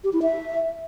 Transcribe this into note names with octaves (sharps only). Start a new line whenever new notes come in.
G4
E4
E5